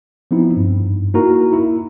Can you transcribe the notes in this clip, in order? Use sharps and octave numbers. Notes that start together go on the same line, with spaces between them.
F3 B3 C4 D#4 E4
G2
A#3 D#4 E4 F#4 A#4 A#5
E4